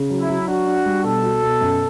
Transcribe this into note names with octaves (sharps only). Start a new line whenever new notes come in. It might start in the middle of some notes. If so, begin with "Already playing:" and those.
Already playing: C#3
F#3
E4
F#3
D4 F#4
D4
G3
B2 A4
F#4
B2
F#2